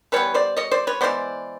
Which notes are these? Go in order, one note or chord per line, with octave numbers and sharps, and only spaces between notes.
E3 G3 B3 B4 C#5
C5 D5
C#5 D#5
C5 D5
B4 C#5
E3 G#3 B3 C5 D5